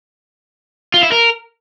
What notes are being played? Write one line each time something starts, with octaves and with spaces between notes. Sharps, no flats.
F4
E4
A#4